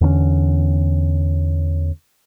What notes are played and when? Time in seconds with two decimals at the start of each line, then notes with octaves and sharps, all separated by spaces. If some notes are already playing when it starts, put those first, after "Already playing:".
0.01 E2 D3 B3 C#4